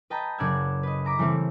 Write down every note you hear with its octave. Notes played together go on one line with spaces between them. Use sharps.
B4 D#5 G5 A5 A#5
F#1 C#3 D5 F#5 E6 G#6
B4 D#5
E5 A#5 D6 B6
C#3 E3 G3 A3 C4 E4